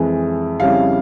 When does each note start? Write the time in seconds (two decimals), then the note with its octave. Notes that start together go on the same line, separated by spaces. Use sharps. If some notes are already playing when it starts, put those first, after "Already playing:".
Already playing: F2 E3 G#3
0.60 F2 C#3 G3 C#4 E4 F5